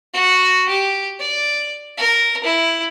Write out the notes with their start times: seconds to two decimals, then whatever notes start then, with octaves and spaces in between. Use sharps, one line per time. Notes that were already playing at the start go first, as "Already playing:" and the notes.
0.14 F#4
0.68 G4
1.19 D5
1.97 A#4
2.45 E4